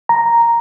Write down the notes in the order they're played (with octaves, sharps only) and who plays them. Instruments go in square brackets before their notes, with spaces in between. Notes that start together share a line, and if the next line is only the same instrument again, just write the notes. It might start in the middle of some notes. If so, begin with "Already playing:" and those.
[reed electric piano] A#5